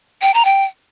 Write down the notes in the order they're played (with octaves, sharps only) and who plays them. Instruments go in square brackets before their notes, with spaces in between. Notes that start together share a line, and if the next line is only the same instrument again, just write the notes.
[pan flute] G5
A#5
G5